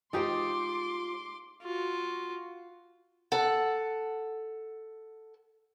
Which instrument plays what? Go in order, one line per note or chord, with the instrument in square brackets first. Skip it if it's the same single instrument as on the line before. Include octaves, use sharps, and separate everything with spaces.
[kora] G#3 D#4 G4 [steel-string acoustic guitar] F4 C5 [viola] C6 D6
[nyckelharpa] F4 F#4
[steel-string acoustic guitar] A4 F#5